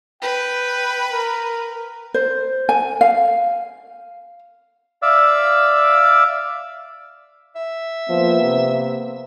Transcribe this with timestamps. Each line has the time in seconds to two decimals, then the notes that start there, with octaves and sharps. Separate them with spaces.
0.22 B4 G5
1.11 A#4
2.14 C5
2.69 G#5
3.01 F5
5.02 D5 E5 F5 E6
7.56 E5
8.09 F3 A#3 B3
8.42 C3